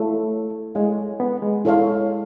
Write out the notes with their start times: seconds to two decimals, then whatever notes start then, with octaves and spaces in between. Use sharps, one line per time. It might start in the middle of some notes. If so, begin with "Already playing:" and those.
Already playing: A3 E4 A4 C#5 F5
0.75 G#3 E4 A4 C#5 F5
1.20 B3
1.42 G#3
1.65 E4 A4 C#5 F5